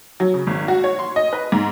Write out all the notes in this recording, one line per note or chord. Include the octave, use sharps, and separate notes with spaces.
F#3
C#3
G#1
F#4
C#5
C6
D#5
B4
G#2